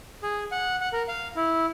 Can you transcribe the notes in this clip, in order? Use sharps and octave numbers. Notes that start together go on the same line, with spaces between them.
G#4
F#5
F#5
A#4
F5
E4